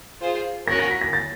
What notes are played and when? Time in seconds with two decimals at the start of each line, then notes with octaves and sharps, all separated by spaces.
0.21 F4 G#4 C5
0.67 C#4 F#4 A#4 A#6
0.79 A#6
0.91 B6
1.01 A#6
1.13 A6